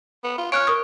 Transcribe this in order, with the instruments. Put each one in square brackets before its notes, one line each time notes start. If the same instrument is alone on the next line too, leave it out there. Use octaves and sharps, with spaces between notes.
[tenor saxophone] B3
F4
[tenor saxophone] C#5 [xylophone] F6 F#6 D7
[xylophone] A#4 C#6 D#6